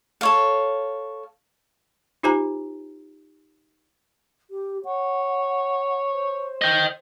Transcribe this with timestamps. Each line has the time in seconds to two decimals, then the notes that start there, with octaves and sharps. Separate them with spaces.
0.21 A4 C#5 F5
2.23 D#4 F4 G4 C5 G#5 A#5
4.51 G4
4.85 C#5 F#5
6.13 C5
6.62 D#5 G5